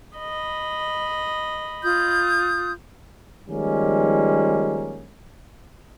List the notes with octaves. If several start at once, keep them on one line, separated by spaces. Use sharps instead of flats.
D#5 B5
F4 D#6 G6
D#3 F3 G3 G#3 A#3 C#4